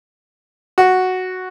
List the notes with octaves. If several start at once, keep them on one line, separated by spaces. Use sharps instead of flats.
F#4